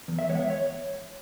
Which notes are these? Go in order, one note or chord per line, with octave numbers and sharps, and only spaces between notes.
E2
E5
E3 G#3 B3 C#5
F#5
E5
C#5